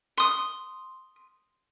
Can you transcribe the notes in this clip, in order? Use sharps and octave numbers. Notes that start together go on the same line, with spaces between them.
C6 D#6